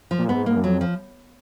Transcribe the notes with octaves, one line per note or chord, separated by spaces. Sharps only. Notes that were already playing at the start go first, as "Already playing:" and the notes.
F3
A#2
G#2 B3
G#2 A#3
F#2
F2 F#3
F3